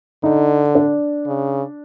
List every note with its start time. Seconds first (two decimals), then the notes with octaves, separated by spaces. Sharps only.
0.23 D3 D#4
0.75 D4
1.27 C#3